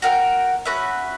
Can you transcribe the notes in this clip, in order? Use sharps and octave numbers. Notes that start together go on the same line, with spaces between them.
F#4 A#4 E5 G5
C#4 F#4 B4 E5